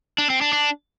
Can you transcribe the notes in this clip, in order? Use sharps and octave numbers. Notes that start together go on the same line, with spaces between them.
D4
C4
D4
D4